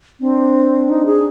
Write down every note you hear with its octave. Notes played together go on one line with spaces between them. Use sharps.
C4 D4
D#4
G#4